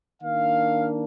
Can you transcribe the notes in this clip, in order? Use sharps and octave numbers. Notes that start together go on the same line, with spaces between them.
D#3 A#3 D4 F5